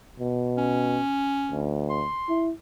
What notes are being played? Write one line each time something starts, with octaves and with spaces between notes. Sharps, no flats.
B2
C#4
D2
C6
E4